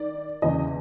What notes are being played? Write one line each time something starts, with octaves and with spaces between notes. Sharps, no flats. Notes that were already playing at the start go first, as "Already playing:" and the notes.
Already playing: D#3 D5
E2 C#3 E3 D#5